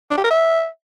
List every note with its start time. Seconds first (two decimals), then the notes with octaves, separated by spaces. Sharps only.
0.11 D4
0.17 G4
0.24 A#4
0.31 E5